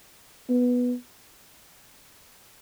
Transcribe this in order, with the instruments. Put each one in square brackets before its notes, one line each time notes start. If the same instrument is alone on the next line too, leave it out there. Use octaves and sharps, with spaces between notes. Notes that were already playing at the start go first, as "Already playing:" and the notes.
[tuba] B3